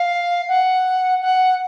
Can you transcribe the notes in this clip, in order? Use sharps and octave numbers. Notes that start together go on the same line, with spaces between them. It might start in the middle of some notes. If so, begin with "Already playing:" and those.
Already playing: F5
F#5
F#5